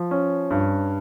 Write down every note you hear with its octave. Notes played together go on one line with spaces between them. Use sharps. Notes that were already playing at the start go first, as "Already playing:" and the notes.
Already playing: F3
C#4
G2